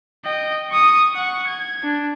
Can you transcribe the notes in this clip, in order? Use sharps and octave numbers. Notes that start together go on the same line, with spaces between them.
D#5 G5
C#6 D#6
F#5 C#6
G#6
D4